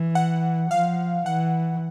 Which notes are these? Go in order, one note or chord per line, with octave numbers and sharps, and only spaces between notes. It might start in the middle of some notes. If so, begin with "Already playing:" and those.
Already playing: E3
F#5
F3 F5
E3 F#5